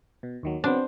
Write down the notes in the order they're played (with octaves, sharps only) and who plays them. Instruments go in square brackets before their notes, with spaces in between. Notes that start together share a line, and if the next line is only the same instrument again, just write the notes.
[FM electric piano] B2
D#2 D#3 F#3
[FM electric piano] C#3 F#3 B3 [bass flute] C4 [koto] D4 [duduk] C5